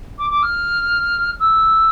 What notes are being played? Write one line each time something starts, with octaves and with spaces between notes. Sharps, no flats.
D6
D6
F6
E6